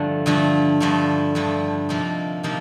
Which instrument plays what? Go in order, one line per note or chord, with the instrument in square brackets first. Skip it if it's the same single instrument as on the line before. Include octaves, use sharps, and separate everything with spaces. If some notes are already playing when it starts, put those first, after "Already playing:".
Already playing: [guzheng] G2 D3 F3 A3
G2 D3 F3 A3
G2 D3 F3 A3
G2 D3 F3 A3
C3 F3 A#3 D#4
C3 F3 A#3 D#4